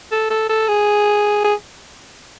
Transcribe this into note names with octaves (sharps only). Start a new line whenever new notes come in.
A4
A4
A4
G#4
G#4